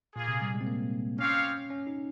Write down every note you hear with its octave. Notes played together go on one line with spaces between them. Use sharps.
A#2 A#3 F4 G#4
C3
G3
G#3
C4
A#3
C4 C#4 G4 C#5 F5
C#4
D#4